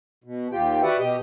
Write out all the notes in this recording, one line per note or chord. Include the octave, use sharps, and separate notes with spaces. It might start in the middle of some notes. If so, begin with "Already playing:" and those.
B2
D#2 F4 G4 G5
F#4 G4 B4 D5 E5 F#5
B2 G4 D#5